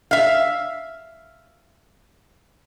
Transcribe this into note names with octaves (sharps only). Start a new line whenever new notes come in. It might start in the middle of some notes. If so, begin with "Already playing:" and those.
E5 F5